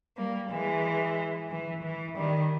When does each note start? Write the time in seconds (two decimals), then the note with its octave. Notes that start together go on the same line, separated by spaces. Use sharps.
0.17 G3 A#3
0.50 E3 G#3
1.50 E3
1.83 E3
2.17 D#3 G3